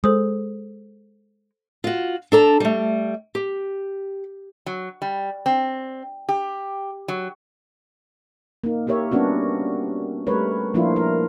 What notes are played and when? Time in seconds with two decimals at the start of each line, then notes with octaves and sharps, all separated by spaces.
0.04 G#3 A4 C5 D#6
1.84 F4 F#4
2.32 D4 A4 A#5
2.60 G3 A3
3.35 G4
4.66 F#3
5.02 G3
5.46 C4
6.29 G4
7.08 F#3
8.64 A#3 D#4
8.87 A#3 G4 A#4 C#5 E5
9.12 G3 B3 C#4 D4 F#4
10.27 G3 A3 A#4 B4 C#5
10.74 F3 A#3 D4 E4 F4
10.96 A#4